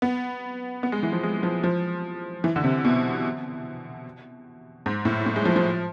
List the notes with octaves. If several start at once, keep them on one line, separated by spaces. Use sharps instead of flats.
B3
B3
G#3
E3
F3
G#3
F3
F3
E3
D3
C3
B2
G#2
A2
A2
G#3
F3
F3